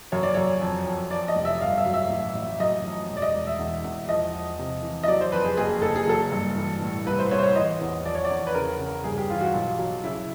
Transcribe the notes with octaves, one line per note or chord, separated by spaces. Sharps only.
F#2 C#5
D5
F#2 C#5
F2
F2
F3 D5
D#5
F1
E5
G1 F5
E5
F#3
E5
A1
A1
F#2 D#5
F3
E1
D5
D#5
E1
E5
E2
E2
F3 D#5
F3
C3
E3
D#5
F#3 D5
C5
F2 B4
G#4
F#1 G#4
F#1 A4
G#4
F#3 A4
G2
E3
A2
C2 B4
C5
C2 C#5
C5
C#5
E3 D#5
E2
F3 D5
C#5
D5
E2
B4
C#3 A#4
C#3
G2 G#4
G4
E3 F4
F#4
B1 F4
F#3
C#3 E4